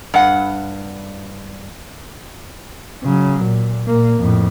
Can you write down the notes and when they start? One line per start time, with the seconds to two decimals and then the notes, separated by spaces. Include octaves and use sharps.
0.14 G2 F#5
3.04 C#3 F#3
3.44 A#2
3.87 A#2 A#3
4.19 F2 A2